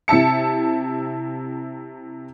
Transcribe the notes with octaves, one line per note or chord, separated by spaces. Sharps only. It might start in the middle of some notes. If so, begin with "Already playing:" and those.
C3 E4 E5 A5 C#7